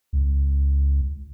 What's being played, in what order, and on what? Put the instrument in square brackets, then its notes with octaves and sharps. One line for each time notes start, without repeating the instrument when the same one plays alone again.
[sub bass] C#2